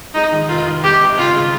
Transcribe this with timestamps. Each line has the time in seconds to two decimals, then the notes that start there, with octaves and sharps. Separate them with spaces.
0.15 G#3 D#4
0.32 D#3
0.49 F1 F4
0.66 D#3
0.84 G1 G4
1.01 F2
1.18 C#3 F4
1.35 C#3